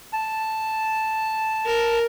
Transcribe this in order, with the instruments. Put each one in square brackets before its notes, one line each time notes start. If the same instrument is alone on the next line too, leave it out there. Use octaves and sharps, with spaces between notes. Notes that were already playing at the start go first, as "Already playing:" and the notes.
[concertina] A5
[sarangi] A#4